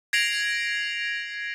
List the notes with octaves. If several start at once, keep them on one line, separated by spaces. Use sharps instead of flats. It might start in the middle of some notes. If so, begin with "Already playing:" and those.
G#6 A#6 C7 D7 F7 F#7